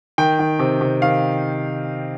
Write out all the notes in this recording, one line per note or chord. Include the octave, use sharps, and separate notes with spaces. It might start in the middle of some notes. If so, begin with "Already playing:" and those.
D#3 G5
D#3
C3
C3
D#3 F5